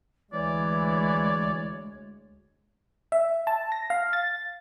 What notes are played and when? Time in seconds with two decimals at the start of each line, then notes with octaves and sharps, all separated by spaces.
0.33 D2 E3 G#3 C#5 D5
3.12 E5
3.47 A5
3.72 A#6
3.90 F5
4.13 A6